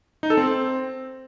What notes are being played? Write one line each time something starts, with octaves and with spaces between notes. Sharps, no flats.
D#4
A4
C4